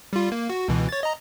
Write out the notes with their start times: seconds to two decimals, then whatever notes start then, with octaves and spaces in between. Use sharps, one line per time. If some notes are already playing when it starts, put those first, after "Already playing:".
0.13 G3 F4
0.32 A#3
0.50 F#4
0.68 C#2 B2 E3
0.89 C#5 A6
1.03 D#5 A#5